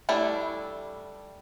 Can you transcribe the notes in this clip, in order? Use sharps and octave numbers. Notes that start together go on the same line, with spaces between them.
G3 A3 D4 E4